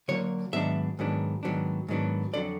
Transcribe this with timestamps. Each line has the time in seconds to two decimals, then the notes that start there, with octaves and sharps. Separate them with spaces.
0.08 D3 F#3 A#3 C#5
0.53 G#2 D#3 F#3 B3 D4 E5
0.99 G#2 D#3 F#3 B3 D4
1.43 G#2 D#3 F#3 B3 D4
1.88 G#2 D#3 F#3 B3 D4
2.33 F2 D3 F#3 D5